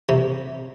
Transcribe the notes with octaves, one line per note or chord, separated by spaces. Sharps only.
C3